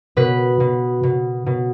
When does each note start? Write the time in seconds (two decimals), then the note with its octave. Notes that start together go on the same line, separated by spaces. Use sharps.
0.17 B2 B4
0.60 B2
1.03 B2
1.46 B2